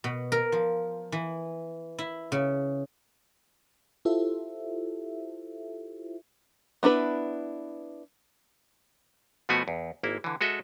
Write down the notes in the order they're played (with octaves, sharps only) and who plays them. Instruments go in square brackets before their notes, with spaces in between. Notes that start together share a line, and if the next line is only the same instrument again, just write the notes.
[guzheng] B2
A#4
F3
E3
E4
C#3
[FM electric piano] E4 F4 G4 A4 C5 E5
[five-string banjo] B3 D4 E4 B4
[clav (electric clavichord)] B2 F3 A3 B3 F#4 G#5
E2
G#1 A#3 E4
D3 E3
G#3 F#4 A4 D#5 E5